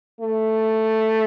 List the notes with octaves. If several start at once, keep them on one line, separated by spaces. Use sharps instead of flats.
A3